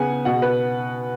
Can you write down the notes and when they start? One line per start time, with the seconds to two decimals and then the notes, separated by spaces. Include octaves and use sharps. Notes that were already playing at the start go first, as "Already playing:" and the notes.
Already playing: C#3 B3 F#5 G#5
0.25 B2 F#5
0.42 B4